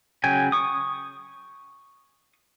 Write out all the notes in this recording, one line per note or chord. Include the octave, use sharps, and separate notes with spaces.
C#3 F#3 C#5 G5 G#5
C#6 D#6